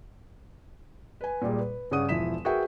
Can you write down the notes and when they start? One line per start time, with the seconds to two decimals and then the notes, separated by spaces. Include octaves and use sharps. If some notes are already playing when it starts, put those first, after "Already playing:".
1.21 B4 G#5
1.42 A#2 G3 G#3
1.59 B4
1.91 G2 C#3 C#4 F#5 D#6 D#7
2.09 E1 F3 E4 B6 E7
2.45 F#4 G#4 A#4 B4 E5 G5